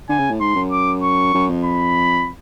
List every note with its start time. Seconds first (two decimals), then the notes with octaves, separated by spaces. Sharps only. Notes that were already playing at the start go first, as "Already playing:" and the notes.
0.09 D3 G#5
0.19 C#3
0.30 A2
0.40 G#2 C6
0.56 F#2
0.71 D6
1.03 C#6
1.34 F#2
1.49 F2
1.65 B5